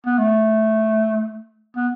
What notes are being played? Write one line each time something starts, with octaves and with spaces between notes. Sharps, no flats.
B3
A3
B3